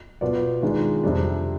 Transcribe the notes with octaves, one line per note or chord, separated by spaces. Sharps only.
B2 B3 F4 B4 D5
D#3 G#3 D4 F4
F2 C3 G3 D4